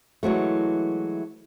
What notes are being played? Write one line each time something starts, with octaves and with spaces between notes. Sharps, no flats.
E3 F#3 G#3 A3